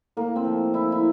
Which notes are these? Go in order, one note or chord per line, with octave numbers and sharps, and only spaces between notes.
A2 A#3
C4
F3
F3 E4
E4